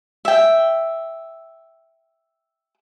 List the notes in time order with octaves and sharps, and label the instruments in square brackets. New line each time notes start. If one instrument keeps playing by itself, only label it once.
[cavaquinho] E5 G5